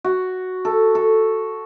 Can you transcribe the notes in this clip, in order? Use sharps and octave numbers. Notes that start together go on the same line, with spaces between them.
F#4
A4
A4